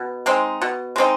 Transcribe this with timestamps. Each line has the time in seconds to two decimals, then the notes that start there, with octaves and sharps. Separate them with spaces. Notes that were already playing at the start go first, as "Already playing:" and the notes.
Already playing: B2
0.26 G#3 C4 D#4
0.62 B2
0.96 G#3 C4 D#4